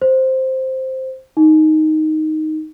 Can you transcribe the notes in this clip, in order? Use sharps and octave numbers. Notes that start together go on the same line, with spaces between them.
C5
D#4